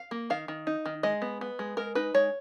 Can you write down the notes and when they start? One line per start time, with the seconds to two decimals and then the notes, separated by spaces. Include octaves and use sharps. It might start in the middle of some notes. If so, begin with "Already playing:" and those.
Already playing: F5
0.11 A#3
0.30 D#3 F5
0.48 D#3
0.67 D#4
0.86 D#3
1.03 G#3 D#5
1.22 B3
1.41 B3
1.59 G#3
1.77 G#3 A#4
1.95 D#4 B4
2.14 G#3 C#5